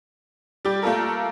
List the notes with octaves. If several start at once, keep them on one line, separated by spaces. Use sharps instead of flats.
G3 G4
A3 A#3 F4 A4 A#4